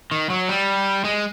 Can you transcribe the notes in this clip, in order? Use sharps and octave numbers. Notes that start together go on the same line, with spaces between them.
D#3
F#3
G3
G#3